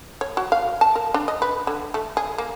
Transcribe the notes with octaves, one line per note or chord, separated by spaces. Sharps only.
C#5
F#4
F5
A5
A#4
D4
D#5
B4
D3
A3
G#4
A#3